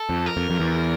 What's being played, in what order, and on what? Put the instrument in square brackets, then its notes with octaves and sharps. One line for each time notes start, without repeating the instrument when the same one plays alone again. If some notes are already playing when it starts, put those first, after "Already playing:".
Already playing: [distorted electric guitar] A4
[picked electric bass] F2
[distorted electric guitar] A#4
[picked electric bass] F2
F2
E2